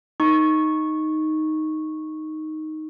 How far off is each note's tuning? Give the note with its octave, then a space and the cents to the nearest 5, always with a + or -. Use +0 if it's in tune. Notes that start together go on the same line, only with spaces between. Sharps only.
D#4 +0 C#6 -10